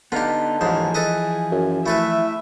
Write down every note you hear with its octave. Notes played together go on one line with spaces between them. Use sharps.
D3 B3 D#4 F4 G4
D#2 G#2 E3 F3 G#4 C6
A4 B4 D#5
F#2
A3 E4 A4 B4 E5